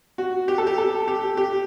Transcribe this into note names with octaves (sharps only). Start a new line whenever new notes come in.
F#4
G4
A4
G4
A4
G4
G4